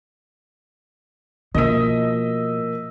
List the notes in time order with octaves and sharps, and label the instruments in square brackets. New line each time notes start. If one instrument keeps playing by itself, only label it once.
[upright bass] B2 [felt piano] F3 A#3 D#7 [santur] D#5 E5